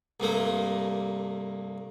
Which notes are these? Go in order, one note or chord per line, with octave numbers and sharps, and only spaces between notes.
C2 G2 A3 A#3